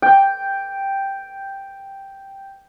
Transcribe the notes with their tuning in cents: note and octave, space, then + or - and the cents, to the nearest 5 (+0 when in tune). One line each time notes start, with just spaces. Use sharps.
G5 +0